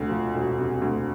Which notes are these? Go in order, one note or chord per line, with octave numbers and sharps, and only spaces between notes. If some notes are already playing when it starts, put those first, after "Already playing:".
Already playing: E1 D2 C3
F3
E1
C3
D2